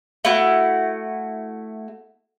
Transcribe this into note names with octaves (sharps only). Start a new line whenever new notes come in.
A3 E4 F#4